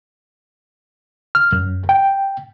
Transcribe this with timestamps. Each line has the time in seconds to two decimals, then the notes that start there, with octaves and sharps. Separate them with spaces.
1.35 F6
1.53 F#2
1.89 G5